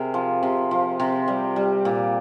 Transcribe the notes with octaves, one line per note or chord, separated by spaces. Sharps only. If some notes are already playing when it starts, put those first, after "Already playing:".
Already playing: C3 G#4 A#4
F3
C3
F3
C3
G3
G3
A#2